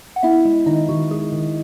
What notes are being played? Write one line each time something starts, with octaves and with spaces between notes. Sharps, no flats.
F#5
B3 E4 E5
G#3
D#3 D#4 D#5
D#3 F#4
G#3 G#4
D#3